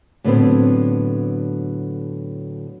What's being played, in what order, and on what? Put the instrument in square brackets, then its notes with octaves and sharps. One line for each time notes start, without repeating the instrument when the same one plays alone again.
[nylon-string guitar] A2 D3 F#3 G3 B3 C4